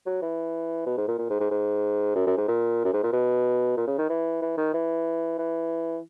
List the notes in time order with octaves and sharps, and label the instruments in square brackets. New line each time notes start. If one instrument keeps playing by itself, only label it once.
[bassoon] F#3
E3
B2
G#2
A#2
A#2
G#2
G#2
G#2
F#2
F#2
G#2
A#2
F#2
G#2
A#2
B2
A#2
C#3
D#3
E3
E3
D#3
E3
E3